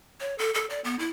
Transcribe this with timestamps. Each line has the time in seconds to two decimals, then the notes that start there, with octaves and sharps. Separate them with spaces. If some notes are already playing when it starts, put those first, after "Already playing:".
0.20 C#5
0.39 A4
0.54 A4
0.70 D5
0.84 B3
0.99 E4